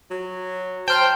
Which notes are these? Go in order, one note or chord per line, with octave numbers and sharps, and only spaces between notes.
F#3
C5 G5 A5 F6 G6